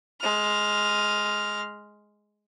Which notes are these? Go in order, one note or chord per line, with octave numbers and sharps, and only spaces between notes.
G#3 F6